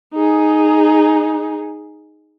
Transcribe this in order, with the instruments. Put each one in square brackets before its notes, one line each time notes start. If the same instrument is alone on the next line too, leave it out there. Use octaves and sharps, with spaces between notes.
[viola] D#4 G#4